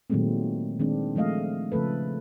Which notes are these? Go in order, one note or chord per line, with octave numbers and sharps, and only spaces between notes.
A#2 D#3 F#3 G#3 A3 C4
D#3 G#3 C4 D4
F3 G#3 A3 D#5 F5
C#3 F3 A3 A4 B4